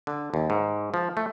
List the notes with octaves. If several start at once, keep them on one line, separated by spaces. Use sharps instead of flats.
D3
D#2
G#2
F3
A3